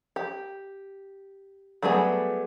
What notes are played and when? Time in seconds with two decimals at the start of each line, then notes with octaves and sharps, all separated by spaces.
0.16 G4
1.82 F#3 G3 A3 B3 G#4